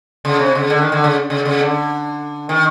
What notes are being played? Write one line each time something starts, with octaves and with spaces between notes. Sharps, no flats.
C#3
C3
C#3
D3
D#3
D3
C#3
C#3
C#3
D3
D#3